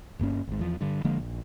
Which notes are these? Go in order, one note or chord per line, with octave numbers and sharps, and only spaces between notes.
G1 G2 A#3 C#4
G#1 G#2
E2 F3
G2 D3
D3 F3 G#3 A#3
A#1